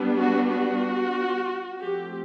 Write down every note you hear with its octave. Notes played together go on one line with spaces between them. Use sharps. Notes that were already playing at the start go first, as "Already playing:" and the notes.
Already playing: G3 B3 D4
F#4
F#4
F3 A3 C4 G4